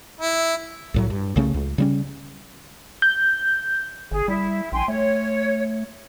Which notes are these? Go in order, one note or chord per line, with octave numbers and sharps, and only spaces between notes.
E4
C2 A2 F#3
G2
C2 C#3 A3 C#4
C#2
C#3 G3 C#4
G6
G1 G#4
G3 E4
A#1 G5 G#5 C6
A3 C#5